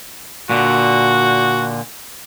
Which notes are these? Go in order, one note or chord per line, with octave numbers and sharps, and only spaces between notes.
A#2 D3 F#4